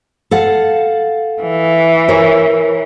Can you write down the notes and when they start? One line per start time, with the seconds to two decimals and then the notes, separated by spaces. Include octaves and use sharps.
0.31 A4 F5 F#5
1.43 E3
2.08 A#4 C#5